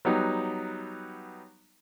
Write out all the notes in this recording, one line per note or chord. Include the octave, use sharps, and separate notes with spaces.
F#3 G3 B3 D#4